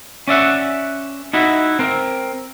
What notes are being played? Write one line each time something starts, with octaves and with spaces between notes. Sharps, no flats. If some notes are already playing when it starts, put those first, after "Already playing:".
C#4 D5 E5 F#5
D#4 E4 F#4 E5
C4 A#4